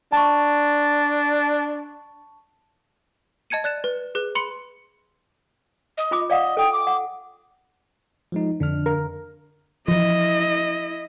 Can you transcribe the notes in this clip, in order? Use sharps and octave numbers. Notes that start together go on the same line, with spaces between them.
D4 A5 C#6
D#5 A5 G#6 C#7 D#7
D5 F#6 A6 E7
B4
G#4 B4 F#6
B5 C6 C#7
D#5
F4 B5 D6
D5 D#5 F5 F#5
A4 G5 D#6
D6
F#5
F3 G#3 D#4
F2 D3 D4 F6
A#4
E3 F3 E4 D#5